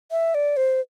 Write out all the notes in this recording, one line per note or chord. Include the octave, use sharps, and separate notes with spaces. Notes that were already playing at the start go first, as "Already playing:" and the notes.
E5
D5
C5